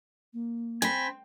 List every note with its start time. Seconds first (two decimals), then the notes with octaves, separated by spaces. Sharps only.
0.33 A#3
0.82 C4 G#5 B5